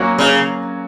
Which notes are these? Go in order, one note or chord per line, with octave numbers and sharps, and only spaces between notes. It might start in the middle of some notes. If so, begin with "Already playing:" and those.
Already playing: F#3 A#3 C#4 F#4
C#3